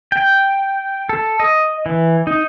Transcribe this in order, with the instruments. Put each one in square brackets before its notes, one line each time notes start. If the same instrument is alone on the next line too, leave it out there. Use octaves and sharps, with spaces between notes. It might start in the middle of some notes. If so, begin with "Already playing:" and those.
[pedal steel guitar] G5
A4
D#5
E3
D#4